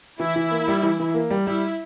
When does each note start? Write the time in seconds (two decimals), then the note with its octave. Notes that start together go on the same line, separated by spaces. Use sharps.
0.20 E3 E4
0.36 E3
0.51 A#3
0.68 G3
0.83 E3
1.00 E3
1.14 A#3
1.30 G3
1.47 G3 E4